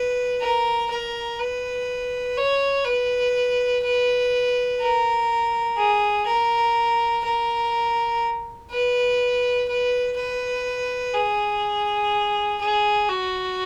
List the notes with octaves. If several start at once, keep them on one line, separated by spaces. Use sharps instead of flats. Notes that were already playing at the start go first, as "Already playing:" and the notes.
Already playing: B4
A#4
A#4
B4
C#5
B4
B4
A#4
G#4
A#4
A#4
B4
B4
B4
G#4
G#4
F#4